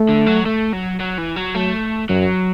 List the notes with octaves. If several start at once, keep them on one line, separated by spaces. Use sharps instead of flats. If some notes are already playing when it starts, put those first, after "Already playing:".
Already playing: A3
D3
F#3
A3
F#3
F#3
E3
F#3
F#3 A3
F#2 F#3